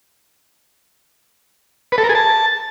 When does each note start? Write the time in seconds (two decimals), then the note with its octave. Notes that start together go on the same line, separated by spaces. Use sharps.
1.92 B4
1.98 A4
2.04 A#4
2.09 G#4
2.15 A5